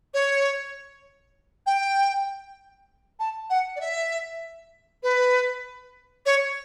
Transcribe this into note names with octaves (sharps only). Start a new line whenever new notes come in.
C#5
G5
A5
F#5
D5
E5
B4
C#5